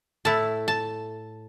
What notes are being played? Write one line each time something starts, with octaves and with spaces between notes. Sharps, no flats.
A2 A3 E4 A5
A5